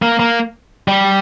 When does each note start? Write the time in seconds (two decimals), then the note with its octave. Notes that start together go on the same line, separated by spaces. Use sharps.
0.02 A#3
0.19 A#3
0.88 G3